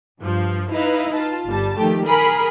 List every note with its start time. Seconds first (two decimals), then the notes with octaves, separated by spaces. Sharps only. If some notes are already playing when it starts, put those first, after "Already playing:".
0.20 G2 F3
0.71 D#4 E4 B4 D#5 F5
1.15 F4 A5
1.46 G1 G3 A5
1.77 D#3 F3 A3 G4
2.06 G#4 A#4 A#5 B5